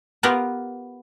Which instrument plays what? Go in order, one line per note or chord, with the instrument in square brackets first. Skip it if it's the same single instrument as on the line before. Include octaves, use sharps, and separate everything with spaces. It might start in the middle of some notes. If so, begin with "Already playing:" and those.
[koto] B3 F4 G4 A#4 B4